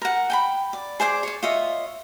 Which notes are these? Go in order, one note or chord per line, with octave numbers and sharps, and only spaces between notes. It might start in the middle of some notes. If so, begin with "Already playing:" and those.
A#4 F#5
G5 G#5 B5
D5
G#4 C5 D5 D6
C#5 D5
F4 C#5 D#5 E5